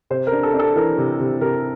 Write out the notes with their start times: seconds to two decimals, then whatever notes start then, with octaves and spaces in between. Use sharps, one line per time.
0.10 C3 C5
0.27 A#4
0.32 D4
0.43 A4
0.54 D4
0.59 A4
0.76 E3 A#4
0.98 C3
1.20 C3
1.41 C3 A#4